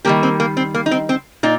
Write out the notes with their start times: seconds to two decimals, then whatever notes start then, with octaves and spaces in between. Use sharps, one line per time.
0.05 D#3 G3 A#3 G4
0.23 C4
0.40 A#3
0.57 C4
0.74 A#3
0.86 D#4
0.91 C4
1.09 C4
1.43 A#2 D#4